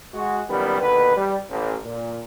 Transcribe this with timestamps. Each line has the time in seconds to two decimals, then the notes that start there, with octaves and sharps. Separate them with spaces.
0.14 G#3 F#4
0.49 F#2 A#2 D#3 G3 B3 G4
0.81 D#2 B2 D3 B4
1.17 G3
1.49 A1
1.85 A#2